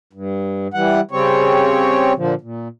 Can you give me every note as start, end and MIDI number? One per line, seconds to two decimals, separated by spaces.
0.13 0.68 43
0.74 1.01 52
0.74 1.01 55
0.74 1.01 78
1.11 2.13 49
1.11 2.13 55
1.11 2.13 60
1.11 2.13 73
2.16 2.34 46
2.16 2.34 50
2.16 2.34 53
2.41 2.68 46